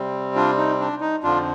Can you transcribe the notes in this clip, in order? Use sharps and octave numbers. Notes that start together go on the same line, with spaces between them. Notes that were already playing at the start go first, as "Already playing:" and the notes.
Already playing: C3 G3 C4
D4 F4
D#4
D4
D#4
F2 D3 F3 D4 F4